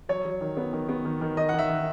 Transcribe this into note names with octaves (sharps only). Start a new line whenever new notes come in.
F#3 C#5
F#3
D#3
B3
D#3
B3
D#3
D#3
D#3 D#5
F#5
D#3
E5
D#3